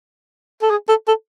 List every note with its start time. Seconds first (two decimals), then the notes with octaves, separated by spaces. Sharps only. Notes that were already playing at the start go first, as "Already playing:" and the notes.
0.62 A4
0.70 G#4
0.88 A4
1.08 A4